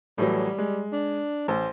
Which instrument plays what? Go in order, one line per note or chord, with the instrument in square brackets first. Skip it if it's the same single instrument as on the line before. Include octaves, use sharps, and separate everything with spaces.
[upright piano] A2 E3 F#3 [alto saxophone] G3
[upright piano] G#3
[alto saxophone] D4
[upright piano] A1 [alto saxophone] C5